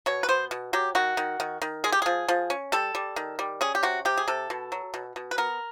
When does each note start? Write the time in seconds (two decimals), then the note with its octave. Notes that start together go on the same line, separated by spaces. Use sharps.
0.06 B2 C#5
0.23 B4
0.29 B3 C5
0.51 B2
0.73 F#3 G4
0.95 D#3 F#4
1.17 D#3
1.40 D#3
1.62 D#3
1.84 G#3 G#4
1.92 G4
2.02 F3 G#4
2.28 F3
2.50 C#4
2.72 G3 A4
2.95 G3
3.16 D#3
3.39 G3
3.61 C#4 G#4
3.75 G4
3.83 C3 F#4
4.05 C3 G4
4.17 G#4
4.28 C3 A4
4.50 B2
4.72 F#3
4.94 B2
5.16 B2
5.31 B4
5.38 B3 A#4